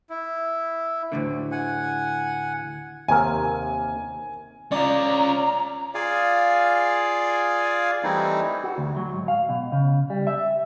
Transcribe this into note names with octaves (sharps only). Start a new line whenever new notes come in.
E4
D2 A2 D3
F#5 G#5
D#2 C3 A#4 G#5
C#4 F4 D5 A#5
F4 G#4 D5 F5 G#5
E3 G3 A3 C4 D#4 E4
F#4
D2
F#3
G#2
F5
B2
C#3
G3
E5